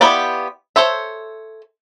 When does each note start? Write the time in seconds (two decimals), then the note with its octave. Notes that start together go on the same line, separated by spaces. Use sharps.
0.01 B3 E4 F4 G4 D5
0.76 A4 C5 C#5 E5